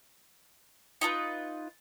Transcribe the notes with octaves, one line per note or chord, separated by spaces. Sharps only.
D#4 F4 A4 B4